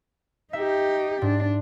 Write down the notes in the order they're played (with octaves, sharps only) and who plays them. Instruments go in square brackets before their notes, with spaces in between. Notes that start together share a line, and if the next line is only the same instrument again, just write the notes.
[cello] D#4 G4 [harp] E5
[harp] G#2 [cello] D4